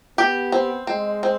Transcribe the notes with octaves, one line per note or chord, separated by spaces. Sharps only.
B3 G4
C4
G#3 C4
C4